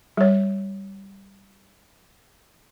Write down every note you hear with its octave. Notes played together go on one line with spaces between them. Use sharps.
G3 C#5